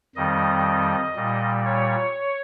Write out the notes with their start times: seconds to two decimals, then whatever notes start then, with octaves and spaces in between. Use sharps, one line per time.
0.16 F2 D#3 G3 D#5
1.15 A#2 G3
1.65 C#5